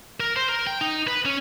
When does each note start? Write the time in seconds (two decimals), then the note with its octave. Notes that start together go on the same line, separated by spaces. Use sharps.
0.20 A#4
0.36 C5
0.49 A#4
0.67 G5
0.81 D#4
1.08 B4
1.26 C#4